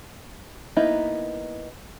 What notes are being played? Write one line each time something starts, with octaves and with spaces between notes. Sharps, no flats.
A#3 B3 D#4 E4